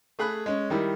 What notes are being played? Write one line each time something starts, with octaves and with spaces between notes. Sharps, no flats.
A3 G#4 B5 F#6
G#3 C#4
D#3 G3 E4